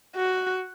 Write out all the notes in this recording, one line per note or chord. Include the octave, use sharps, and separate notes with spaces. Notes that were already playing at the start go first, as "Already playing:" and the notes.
F#4